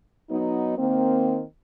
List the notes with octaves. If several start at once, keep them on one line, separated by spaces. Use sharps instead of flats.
F#3 B3 D#4
D#3 A#3 C4